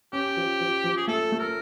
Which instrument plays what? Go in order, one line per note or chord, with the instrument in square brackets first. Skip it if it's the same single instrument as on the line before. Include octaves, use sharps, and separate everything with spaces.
[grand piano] C#4 [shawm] G4
[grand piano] F3
F3
F3
[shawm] G#4
[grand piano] A3 [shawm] A4
[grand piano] A3
[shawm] A#4